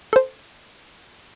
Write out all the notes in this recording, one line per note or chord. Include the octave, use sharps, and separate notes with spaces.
A4 C5